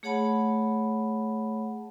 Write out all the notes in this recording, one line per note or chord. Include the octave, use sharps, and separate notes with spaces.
A3 G#4 C#5 F#5 A5 B5